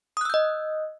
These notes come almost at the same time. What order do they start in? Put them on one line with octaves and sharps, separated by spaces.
D#6 F#6 E6 G6 D#5